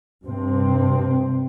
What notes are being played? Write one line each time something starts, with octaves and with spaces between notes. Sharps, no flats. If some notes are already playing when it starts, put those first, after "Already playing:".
G2 C3 C4